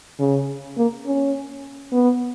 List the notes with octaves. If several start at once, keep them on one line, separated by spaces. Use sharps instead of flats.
C#3
A#3
C#4
B3